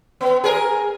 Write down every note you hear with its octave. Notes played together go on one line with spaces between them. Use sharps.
B3
G#4 A#4